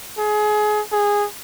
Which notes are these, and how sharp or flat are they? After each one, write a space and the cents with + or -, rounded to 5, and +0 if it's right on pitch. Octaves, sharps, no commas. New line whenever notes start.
G#4 +25
G#4 -15